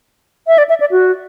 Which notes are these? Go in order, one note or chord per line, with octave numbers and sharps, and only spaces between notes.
E5
D5
E5
D5
F#4